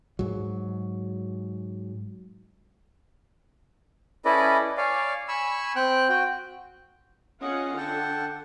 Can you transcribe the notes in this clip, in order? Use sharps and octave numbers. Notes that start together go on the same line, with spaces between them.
G#2 F#3
C#4 E4 A4 B4 D5 D#5
C#5 D5 F5 G#5
G#5 B5 C#6 E6
C4 G5 F#6
F#4 G5
C#4 F4 G#4 D#5 F#5
D3 F#5 G5 A5